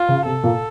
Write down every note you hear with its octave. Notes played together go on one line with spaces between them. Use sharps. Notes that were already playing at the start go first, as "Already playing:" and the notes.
Already playing: F4
C#3
C3 A4
A#2